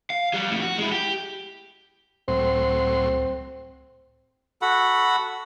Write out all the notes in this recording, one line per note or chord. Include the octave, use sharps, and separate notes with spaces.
F5
F#3 G3
F2 A2
F#4
G#3 E4
G4
C#2 A2 F#3 C4 C6
F#4 A4 F#5 B5